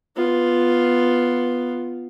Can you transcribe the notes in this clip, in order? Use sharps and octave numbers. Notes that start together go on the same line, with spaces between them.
B3 F4